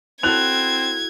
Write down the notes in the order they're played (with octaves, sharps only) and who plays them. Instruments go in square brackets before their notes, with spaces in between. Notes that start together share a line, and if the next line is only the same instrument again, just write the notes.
[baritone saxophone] C4 [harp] E4 F#4 A4 [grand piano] F#6 F7 [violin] G#6